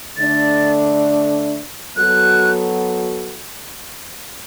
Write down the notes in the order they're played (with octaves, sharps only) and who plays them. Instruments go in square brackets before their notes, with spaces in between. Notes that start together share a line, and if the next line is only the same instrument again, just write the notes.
[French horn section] D3 A3 D4 [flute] A6
[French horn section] F#3 B3 F#4 A4 [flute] F#6